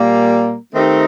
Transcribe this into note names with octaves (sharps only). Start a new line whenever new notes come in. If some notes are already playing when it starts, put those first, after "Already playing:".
Already playing: A#2 G3 A#3
D#3 A3 C4 D#4 G4